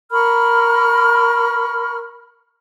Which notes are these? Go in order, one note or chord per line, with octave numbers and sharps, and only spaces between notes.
A#4 B5 C#6 F6